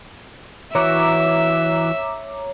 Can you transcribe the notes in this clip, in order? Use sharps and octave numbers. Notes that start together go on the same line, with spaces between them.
E3 F#4 C#5 E5 A#5 D6